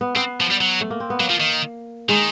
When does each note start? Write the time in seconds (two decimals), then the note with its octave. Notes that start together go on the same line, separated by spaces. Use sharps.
0.01 B3
0.16 B3 C4
0.41 F3
0.51 G3
0.61 F#3
0.81 A3
0.90 A#3
1.00 C4
1.10 B3
1.20 F#3 A#3
1.30 F3
1.40 D#3
2.09 D#3 G#3